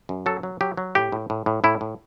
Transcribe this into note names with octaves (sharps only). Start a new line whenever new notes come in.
F#2
F#3 A4
F#3
F#3 G4
F#3
A2 G4
A2
A2
A2
A2 E4
A2